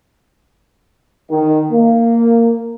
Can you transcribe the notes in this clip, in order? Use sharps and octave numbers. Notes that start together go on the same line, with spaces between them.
D#3
A#3